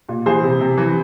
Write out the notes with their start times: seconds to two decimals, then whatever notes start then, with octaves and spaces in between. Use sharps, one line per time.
0.09 A#2
0.26 E3 G#4 C5
0.43 C3
0.60 C3
0.78 E3